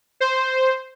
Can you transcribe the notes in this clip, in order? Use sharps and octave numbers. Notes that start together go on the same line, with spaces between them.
C5